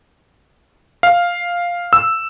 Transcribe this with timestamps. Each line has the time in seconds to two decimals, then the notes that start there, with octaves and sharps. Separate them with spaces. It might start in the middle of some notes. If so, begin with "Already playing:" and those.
1.03 F5
1.93 E6